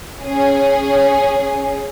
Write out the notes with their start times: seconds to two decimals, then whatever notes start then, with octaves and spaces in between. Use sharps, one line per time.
0.22 C#4 G#4